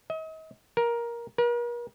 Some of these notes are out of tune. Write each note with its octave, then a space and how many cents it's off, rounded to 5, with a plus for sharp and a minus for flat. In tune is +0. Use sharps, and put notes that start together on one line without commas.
D#5 +40
A#4 +15
A#4 +45